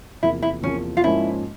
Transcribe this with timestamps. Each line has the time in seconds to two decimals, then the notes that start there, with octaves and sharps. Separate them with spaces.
0.23 E2 C3 F3 A#3 E4
0.42 E4
0.63 E2 C3 F3 A#3 C#4
0.97 F4
1.04 G#2 F3 A#3 C#4 E4